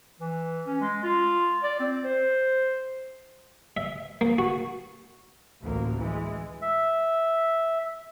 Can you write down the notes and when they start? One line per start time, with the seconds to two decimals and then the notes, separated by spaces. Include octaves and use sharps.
0.20 E3
0.66 C#4
0.81 G#3
1.03 F4
1.63 D5
1.80 C4
2.04 C5
3.77 E5
4.21 A#3
4.38 F#4
5.63 A1 D2 A#3
5.97 E3 G#3
6.62 E5